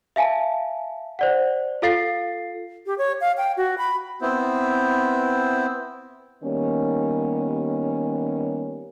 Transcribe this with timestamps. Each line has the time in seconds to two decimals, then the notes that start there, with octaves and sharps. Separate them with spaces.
0.16 E5 F5 G#5 A5
1.19 C5 D5 F#5
1.82 F4 A4 F5 A6 C7
2.86 G4
2.98 C#5
3.21 F5
3.38 G5
3.57 F#4
3.78 B5
4.22 B3 C4 E4 C5
6.43 D#3 G3 A#3 B3 C#4